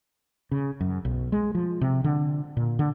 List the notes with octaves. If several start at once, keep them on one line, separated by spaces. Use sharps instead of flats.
C#3
F#2
B1
G#3
F3
C3
D3
A#2
D3